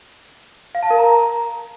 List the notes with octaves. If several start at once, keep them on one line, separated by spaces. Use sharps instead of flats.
F5
A5
A#4
A#5